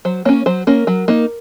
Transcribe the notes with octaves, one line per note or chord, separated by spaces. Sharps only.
F#3 C5
A#3 C#4 C#5
F#3 C5
A#3 C#4 A#4
F#3
A#3 D#4